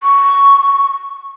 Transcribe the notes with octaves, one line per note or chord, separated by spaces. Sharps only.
C#6